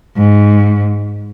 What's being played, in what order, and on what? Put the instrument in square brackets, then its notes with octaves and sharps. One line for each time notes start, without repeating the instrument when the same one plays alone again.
[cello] G#2